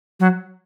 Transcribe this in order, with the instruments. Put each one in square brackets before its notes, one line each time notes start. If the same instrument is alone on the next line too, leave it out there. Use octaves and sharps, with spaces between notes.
[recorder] F#3